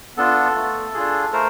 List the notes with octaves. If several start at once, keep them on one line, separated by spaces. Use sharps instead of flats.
B3 D4 F4 A4
A3
D4 F4 G#4
A3 A#4 C5